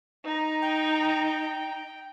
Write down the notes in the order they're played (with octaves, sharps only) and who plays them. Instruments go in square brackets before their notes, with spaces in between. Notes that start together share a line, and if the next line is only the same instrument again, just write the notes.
[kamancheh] D#4 A#5
[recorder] G5